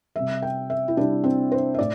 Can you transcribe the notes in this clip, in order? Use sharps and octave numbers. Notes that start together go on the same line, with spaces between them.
C3 G3 E5
G5
E5
E4
C3 G3 D4
C4
C5
E5
A2 D5